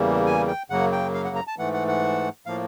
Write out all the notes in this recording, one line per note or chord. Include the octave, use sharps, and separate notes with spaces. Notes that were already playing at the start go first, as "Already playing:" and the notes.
Already playing: E2 C#3 E3 G3 A#3
G#5
G5
F#2 C#3 F#3 A#3 F#5
G5
F5
F#5
A#5
A5
G#2 E3 A3 F#5
F#5
F#5
A2 F3 A#3 F5